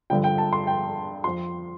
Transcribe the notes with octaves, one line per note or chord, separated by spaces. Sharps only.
G2 D3 F3 G5
G5
A5
C6
G5
F2 F3 C6